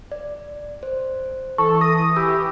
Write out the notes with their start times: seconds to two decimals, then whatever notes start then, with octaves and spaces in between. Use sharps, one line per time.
0.12 D5
0.83 C5
1.58 E3 A4 C#6
1.81 D#6 A#6
2.16 G4 B5 E6